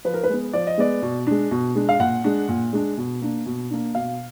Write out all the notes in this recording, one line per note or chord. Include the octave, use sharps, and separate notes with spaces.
F3 B4
A#4
B4
G#3 B3
F3 D5
D#5
G#3 B3 D5
B2
G#3 D4
B2
G#3 D4
F5
A#2 F#5
G#3 D4
A#2
G#3 D4
B2
A#3 D4
B2
A#3 D4
B2 F5